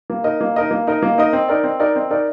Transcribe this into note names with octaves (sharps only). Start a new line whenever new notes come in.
A#3
D#4 A#4 D#5
A#3
D#4 A#4 D#5
A#3
D#4 A#4 D#5
A#3
D#4 A#4 D#5
C4
D#4 A#4 D5
C4
D#4 A#4 D5
C4
D#4 A#4 D5